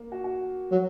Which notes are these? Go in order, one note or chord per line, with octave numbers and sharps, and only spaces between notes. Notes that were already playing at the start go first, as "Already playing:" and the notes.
Already playing: A#3
F#4
F#4
F#3